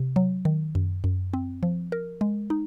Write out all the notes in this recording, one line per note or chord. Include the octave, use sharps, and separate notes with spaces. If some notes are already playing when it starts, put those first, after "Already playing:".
Already playing: C3
F#3
D#3
F#2
F#2
C4
F3
A#4
G#3
D#4